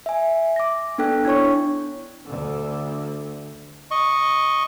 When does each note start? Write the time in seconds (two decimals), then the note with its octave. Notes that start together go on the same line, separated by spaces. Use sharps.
0.06 E5 G#5
0.56 D6 A#6
0.98 B3 D4 A4 G5 F#6
1.25 D4 E4 C#5 C#6
2.26 D2 D3
3.91 D#5 C#6